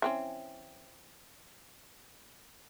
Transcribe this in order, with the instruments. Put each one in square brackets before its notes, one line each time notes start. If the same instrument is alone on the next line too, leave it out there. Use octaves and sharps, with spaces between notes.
[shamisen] E3 C4 C#4